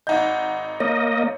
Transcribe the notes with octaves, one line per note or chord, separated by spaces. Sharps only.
G#1 D#4 D#5 F#5 G6
A#3 C#5 D#5